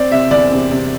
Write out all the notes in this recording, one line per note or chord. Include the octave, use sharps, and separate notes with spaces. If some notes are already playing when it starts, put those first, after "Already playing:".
Already playing: C4 D5
C3 E5
E2 D5
C3
C3